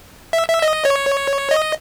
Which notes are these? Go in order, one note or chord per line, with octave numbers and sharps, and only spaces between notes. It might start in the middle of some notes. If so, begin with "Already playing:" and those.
E5
E5
D#5
C#5
D#5